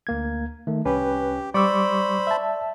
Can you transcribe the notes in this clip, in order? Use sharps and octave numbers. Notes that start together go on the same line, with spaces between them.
D2 A#3 G#6
D#3 A3
C2 C#4 G4 B4
G3 C5 D5 B5 C#6 D6 E6
E5 A5